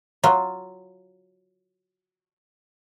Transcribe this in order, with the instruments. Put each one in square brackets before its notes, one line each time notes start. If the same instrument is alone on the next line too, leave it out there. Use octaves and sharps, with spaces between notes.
[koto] F#3 F4